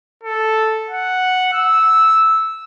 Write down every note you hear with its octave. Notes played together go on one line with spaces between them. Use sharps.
A4
F#5
E6